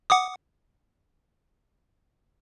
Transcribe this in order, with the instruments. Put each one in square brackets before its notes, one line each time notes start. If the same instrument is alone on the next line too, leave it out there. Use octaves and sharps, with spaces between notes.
[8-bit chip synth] F#5 D6 D#6